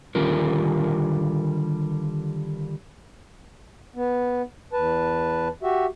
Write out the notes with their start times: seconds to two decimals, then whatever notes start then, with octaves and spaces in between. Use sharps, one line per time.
0.15 D3 D#3 G3 F4 A#4
3.95 B3
4.73 E2 B4 A5
5.63 F#4 G4 E5